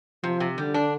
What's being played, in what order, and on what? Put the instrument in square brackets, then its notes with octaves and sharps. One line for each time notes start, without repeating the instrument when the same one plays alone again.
[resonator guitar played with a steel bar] C3 [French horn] F3
[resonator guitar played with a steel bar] C3
[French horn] D3 [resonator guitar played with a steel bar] G3
[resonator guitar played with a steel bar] D4